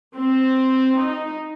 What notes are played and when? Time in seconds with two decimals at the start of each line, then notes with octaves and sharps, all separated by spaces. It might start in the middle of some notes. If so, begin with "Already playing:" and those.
0.17 C4
0.99 D#4